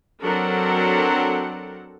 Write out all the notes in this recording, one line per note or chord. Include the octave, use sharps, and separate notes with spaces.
F#3 C4 D4 A4 A#4 F#5